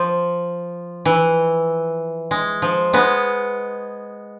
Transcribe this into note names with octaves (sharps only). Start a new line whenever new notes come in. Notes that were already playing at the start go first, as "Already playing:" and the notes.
Already playing: F3
E3
G#3
F3
G#3 B3